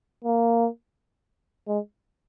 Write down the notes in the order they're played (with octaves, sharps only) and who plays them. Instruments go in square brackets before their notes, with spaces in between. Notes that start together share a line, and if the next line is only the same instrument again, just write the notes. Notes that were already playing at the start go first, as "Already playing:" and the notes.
[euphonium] A#3
G#3